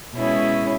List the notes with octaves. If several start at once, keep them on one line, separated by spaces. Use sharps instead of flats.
B2 G#3 C#4 E4